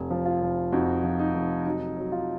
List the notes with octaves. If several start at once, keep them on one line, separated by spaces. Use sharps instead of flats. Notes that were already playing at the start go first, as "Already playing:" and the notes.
Already playing: F1
F3
F4
F1
F2 D#4 F#4
F3
D#4
F1
F#3 D#4
F#3
F4